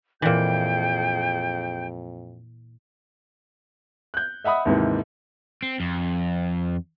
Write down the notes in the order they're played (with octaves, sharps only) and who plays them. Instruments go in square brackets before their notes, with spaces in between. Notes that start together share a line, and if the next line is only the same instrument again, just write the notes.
[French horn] F2 [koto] A#2 E3 [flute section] G#4 G5 G6
[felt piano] F#6 G6
D#5 E5 F#5 B5 D#6
D#2 G#2 C3 E3
[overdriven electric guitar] C4
F2